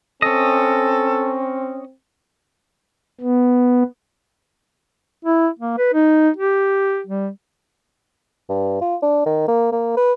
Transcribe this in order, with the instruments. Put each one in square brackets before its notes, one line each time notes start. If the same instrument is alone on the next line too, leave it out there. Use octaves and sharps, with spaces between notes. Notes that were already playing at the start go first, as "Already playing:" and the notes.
[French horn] C4 [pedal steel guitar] C#4 D#5 [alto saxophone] A4
[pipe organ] B3
[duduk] E4
A#3
B4
D#4
G4
G3
[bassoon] G2
F4
D4
D#3
A#3
A#3
B4